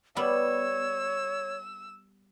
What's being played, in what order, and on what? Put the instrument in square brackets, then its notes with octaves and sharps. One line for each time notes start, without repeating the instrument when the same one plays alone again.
[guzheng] G3 B3 [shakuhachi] C#5 [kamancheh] E6